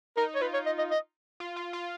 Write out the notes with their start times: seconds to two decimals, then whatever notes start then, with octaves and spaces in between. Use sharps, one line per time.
0.17 D#4 A#4
0.35 C#5
0.41 F4 B4
0.54 C#5
0.66 D#5
0.78 D#5
0.91 D#5
1.40 F4
1.56 F4
1.73 F4